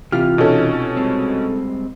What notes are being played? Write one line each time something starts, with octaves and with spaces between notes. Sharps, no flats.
C3 E3 F4 G4 F6
B2 C#4 D#4 A4
G3 G#3 C4